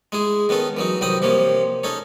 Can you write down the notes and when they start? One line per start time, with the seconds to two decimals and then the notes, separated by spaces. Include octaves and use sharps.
0.12 G#3 E4 G#4
0.49 D#3 B3 C#4 A4
0.77 E3 F#3 D#4
1.01 C2 D#3 F#3 G5 B5 D#6
1.22 C3 F3 A#3 C#5
1.84 C#4 D#4 A4 C#5